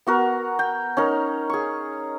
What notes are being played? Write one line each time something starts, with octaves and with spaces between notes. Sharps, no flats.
B3 F#4 A#4
G5
C#4 D#4 A#4
G#4 C#6